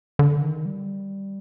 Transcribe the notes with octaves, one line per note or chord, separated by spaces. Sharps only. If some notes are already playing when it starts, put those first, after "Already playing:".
D3
D#3
G3